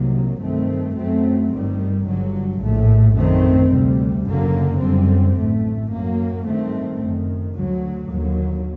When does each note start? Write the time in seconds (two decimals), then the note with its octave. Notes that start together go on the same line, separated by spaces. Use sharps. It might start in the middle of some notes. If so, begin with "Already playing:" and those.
Already playing: C2 C3 D#3 F#3 A#3
0.40 G2 D#3 A3 C4
0.95 F#2 F#3 A3 C4
1.51 G1 G2 D#3 G3
2.05 G1 G2 D3 F#3
2.60 A#1 A2 A3
3.15 F#2 D#3 A3 C4
3.71 D2 C3 G3
4.26 F#1 F#2 D3 F#3 A#3
4.80 F#2 D3 G3 C4
5.35 A1 A2 A3
5.90 F#2 F#3 A#3
6.45 G2 D#3 A3 C4
7.00 F#1 F#2 D#3
7.56 D2 D3 F#3
8.10 D#2 D3 F#3 A#3